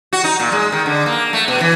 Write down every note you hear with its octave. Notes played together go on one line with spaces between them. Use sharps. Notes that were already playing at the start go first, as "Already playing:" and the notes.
F#4
D#4
A#2
G#3
D#3
D3
A#3
A3
B2
E3